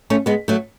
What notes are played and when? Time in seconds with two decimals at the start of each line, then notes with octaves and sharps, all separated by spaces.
0.10 A3 C#4
0.26 G#3 B3
0.48 F#3 A3